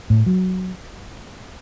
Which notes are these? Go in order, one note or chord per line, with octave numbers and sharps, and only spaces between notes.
A2
F#3